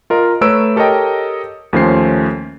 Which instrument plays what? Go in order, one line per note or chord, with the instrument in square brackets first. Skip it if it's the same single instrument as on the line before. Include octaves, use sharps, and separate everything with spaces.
[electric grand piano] F4 A#4 D#5
A3 B4 C#5 A#5 E6 D7
G4 A4 A#4 C#5 D#5 G5
D#2 F3 A3 C#4 C5 C7